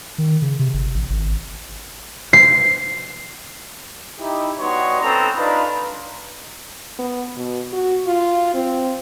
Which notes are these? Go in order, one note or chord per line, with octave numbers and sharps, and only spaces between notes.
D#3
C#3
C3
G1
A1
G#1
C7
D#4 E4 G4
G3 B3 D#4 F#4 C#5 C6
C4 C#4 A4 B4 A#5 D#6
D4 D#4 F4 B4
B3
B2
F#4
F4
C4